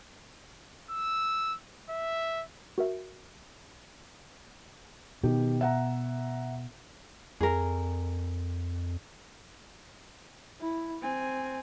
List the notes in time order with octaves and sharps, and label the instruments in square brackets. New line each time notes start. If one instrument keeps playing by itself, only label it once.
[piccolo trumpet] E6
E5
[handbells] F#4 A#4 E5
[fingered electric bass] B2 [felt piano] D#3 G4
[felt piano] E5 F#5 A#5
[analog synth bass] F2 [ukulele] G#4 A#4
[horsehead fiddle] E4
C4 G#5